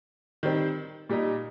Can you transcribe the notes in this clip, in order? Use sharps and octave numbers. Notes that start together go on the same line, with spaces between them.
D#3 G3 C4
A#2 G3 D#4